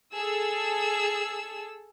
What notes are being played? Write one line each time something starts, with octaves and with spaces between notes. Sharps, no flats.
G#4 A4 E6